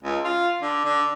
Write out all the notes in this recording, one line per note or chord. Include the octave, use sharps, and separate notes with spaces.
C#2
F4
D3
D3